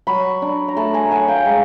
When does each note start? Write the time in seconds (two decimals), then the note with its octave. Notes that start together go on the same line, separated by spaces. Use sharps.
0.07 F#3 B5 C#6
0.42 D4
0.68 A#5
0.76 A3 A5 B5
0.94 G#5 A#5
1.11 F#3 F#5 G#5
1.28 F5 G5
1.45 G#3